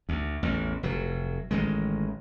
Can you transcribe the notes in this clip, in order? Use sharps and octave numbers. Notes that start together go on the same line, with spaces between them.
D2
A1 E2
F1 F#3
A1 D#3 G#3